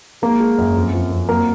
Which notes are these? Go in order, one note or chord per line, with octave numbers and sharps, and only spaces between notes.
G#3 A#3 A#4
G#3
F#2
F2
F3
F2
F#3 A#3 A#4